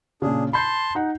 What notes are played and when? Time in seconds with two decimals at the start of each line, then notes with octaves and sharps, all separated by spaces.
0.22 A#2 C#3 D4 G#4
0.53 A5 B5 C6 G6 C7
0.95 D#4 F#5